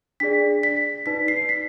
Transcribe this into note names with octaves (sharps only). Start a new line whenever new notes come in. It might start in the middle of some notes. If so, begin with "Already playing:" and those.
D4 G#4 D5 B6
B6
D#4 B4 D5 B6
C7
B6